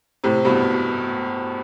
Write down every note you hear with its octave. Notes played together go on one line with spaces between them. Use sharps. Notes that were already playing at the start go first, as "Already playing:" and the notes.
A2 C3
G2 B2